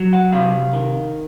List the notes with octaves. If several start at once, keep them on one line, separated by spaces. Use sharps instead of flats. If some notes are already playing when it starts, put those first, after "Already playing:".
Already playing: F#3
F#5
C3 F5
D#3